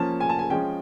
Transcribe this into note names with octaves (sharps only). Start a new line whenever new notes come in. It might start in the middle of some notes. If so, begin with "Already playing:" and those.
Already playing: F3 A#3 C#4 A5
G#5
A5
G#5
F3 G#3 C#4 G5